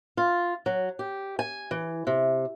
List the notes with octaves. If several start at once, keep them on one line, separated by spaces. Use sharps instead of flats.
F4
F#3
G4
G#5
E3
C3